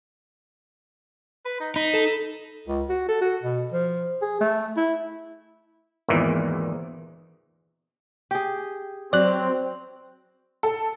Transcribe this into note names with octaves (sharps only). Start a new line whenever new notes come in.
B4
D#4
D#4 B5
A4
C#2
F#4
A4
F#4
B2
F3
G#4
A3
E4
G#1 E2 A#2 D#3 E3
G4 G#4
F#3 C4 D5 F#6
A4